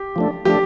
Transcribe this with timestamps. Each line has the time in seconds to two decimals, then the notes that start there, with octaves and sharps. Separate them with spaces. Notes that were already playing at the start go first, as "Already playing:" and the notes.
Already playing: G4
0.16 F3 A3 D4
0.45 F3 A3 D4 G4